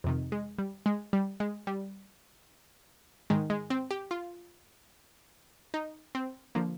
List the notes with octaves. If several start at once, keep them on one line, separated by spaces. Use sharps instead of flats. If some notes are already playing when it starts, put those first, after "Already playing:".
F2 C3 D#3
G#3
G3
G#3
G3
G#3
G3
G#2 D#3 G#3
G#3
C4
G4
F4
D#4
C4
D3 F3 A#3